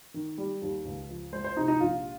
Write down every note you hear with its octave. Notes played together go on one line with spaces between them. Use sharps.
D#3
G3
D#2
C#2
F3
G#3 C5
C5
C3 D#4
D#4
A#1 F4